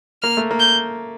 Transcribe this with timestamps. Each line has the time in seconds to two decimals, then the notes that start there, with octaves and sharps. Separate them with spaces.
0.22 A#3 F6
0.37 A3
0.51 A#3
0.60 G6